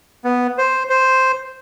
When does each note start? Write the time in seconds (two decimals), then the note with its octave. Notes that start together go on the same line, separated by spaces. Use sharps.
0.24 B3
0.58 C5
0.89 C5